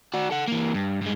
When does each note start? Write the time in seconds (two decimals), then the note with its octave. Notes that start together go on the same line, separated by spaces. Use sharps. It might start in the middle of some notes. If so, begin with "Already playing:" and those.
0.14 F#4 D5
0.31 A4 F#5
0.48 E3 A#3
0.74 G2
1.02 G2 G#3